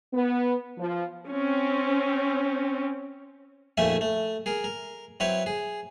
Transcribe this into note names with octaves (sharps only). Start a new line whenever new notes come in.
B3
F3
C4 C#4
A#1 F2 D#3 A3 E5 G#5
A3
G#4 A#4
A#4
F#3 C4 E4 B4 C#5
G#4